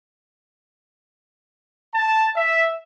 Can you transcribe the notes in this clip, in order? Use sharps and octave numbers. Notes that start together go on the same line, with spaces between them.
A5
E5